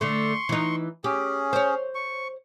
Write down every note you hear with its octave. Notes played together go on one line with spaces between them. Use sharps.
D3 A3 C6 C#6
E3 D#4
C#4 G4 G#4
C5 C#5
C#6